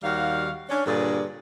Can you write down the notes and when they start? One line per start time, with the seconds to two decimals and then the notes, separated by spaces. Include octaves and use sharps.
0.03 D#2 D#3 G3 F#4 F5
0.69 C#4 D4
0.86 G2 A#2 D3 G#4 A4 D5